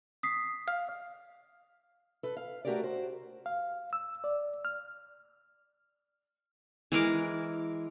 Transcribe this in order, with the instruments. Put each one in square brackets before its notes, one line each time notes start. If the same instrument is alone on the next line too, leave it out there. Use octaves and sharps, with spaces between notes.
[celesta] D#6 B6 C7
[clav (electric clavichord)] F5
[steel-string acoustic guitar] A4 B4
F5
A3 F#4 G4 A4 A#4 D5
F#4 C5
[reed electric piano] F5
E6
D5
F6
[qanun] E3 G#3 A#4 D6